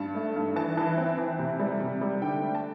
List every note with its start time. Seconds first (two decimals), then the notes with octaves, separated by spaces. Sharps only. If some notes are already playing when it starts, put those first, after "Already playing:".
Already playing: G2 A5
0.15 A3
0.36 G2
0.56 E3 A5
0.77 E3
0.98 C4
1.18 E3
1.39 C3
1.60 G3
1.80 C3
2.01 G3
2.22 D3 G5
2.43 A3
2.55 A5